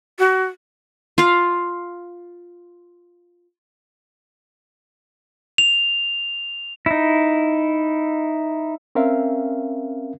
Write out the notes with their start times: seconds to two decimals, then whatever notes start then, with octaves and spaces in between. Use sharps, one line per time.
0.19 F#4
1.18 F4 F5
5.58 F7
6.86 D#4 E4
8.95 C4 C#4 A#4 E5 F5